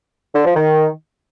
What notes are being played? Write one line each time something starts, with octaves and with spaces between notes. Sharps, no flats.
D3
F3
D#3